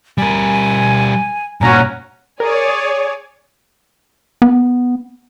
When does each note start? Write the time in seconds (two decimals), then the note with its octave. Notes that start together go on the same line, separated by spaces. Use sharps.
0.18 G3 A#4 G#5
1.61 G2 A#2 C#4 F#4 G#5 A#5
2.40 G#4 A#4 C#5 D5
4.42 B3